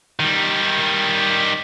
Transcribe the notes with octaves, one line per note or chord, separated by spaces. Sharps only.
D#3 G3